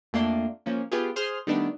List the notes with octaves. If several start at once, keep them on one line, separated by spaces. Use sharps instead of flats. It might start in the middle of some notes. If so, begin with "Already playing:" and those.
F2 A3 A#3 D4 C6
F3 A#3 C#4
B3 F4 G4 G#4
G#4 C5 C6 D#6 F6
D#3 G3 A3 B3 D4